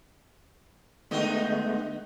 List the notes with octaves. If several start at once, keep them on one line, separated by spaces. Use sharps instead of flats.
D3 G#3 A3 B3 D#4 F#4